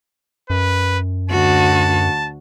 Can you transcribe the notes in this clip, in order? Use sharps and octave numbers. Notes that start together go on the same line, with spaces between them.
F#2 B4
D2 F#4 A5